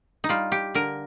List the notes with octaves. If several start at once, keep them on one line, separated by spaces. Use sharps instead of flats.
D#4
G3 F4
G4
D3 A#4